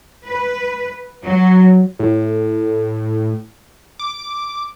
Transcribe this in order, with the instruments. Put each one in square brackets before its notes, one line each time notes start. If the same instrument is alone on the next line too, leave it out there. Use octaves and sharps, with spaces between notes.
[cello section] B4
F#3
[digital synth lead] A2
D6